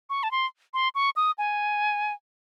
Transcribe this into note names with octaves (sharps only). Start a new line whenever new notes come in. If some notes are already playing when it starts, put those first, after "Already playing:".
C#6
A5
C6
C6
C#6
D#6
G#5